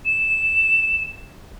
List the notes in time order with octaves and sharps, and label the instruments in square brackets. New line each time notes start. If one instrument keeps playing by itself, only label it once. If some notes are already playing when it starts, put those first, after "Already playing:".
[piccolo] E7